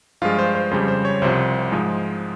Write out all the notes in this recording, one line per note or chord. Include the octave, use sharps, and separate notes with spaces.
G2 F3 G#3 F4
C5
C5
F2 C#3 G3 C5
C5
C#5
C2 C3 F3 C5
G#2 F3 G#3